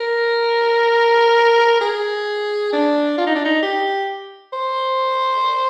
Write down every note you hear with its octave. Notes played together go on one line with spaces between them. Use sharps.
A#4
G#4
D4
F4
D#4
D4
D#4
G4
C5